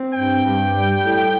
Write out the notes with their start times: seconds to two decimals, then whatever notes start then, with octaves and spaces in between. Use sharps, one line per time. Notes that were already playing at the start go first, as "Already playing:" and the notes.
Already playing: C4
0.14 G2 G5
0.44 G2
0.74 G3
1.02 A2